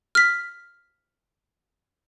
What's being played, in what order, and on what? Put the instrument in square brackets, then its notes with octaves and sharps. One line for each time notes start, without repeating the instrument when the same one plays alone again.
[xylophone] F6 B6